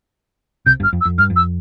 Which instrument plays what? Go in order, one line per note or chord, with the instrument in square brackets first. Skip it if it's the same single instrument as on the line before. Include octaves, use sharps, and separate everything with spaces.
[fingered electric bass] C2 C3 [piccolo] G6
[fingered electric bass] G1 G2
[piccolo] F6
[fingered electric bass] F2
[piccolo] E6
[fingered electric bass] F2
[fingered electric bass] G2 [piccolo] F6
[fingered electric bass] F2
[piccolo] E6